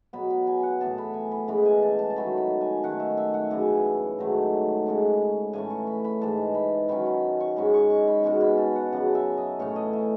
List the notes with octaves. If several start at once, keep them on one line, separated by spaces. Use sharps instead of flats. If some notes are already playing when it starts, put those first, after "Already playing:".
B2 F#3 B3 B5
B5
G#5
F#5
A2 E3 B3 A5
B5
G#5
B5
C#3 E3 G#3 B5
G#5
A5
A5
A5
D#3 F#3 A3 B5
B5
G#5
D#3 A3 C#4 F#5
E5
E5
F#5
F#2 C#3 E3 G#5
G#2 D#3 F#3 A3
C#3 G#3 C#4
A2 E3 A3 C#4 G#5
C#6
B5
B5
G#2 E3 G#3 A5
B5
D#3 F#3 C#4 B5
B5
C#6
G#2 D#3 G#3 C#4 B5
C#6
C#6
B5
B2 G#3 C#4 C#6
B5
A5
F#5
F#2 C#3 F#3 F#5
E5
D#5
A2 E3 A3 C#4 C#5
D#5
E5